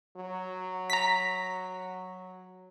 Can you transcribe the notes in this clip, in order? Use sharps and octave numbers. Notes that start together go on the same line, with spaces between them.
F#3
A#5 B6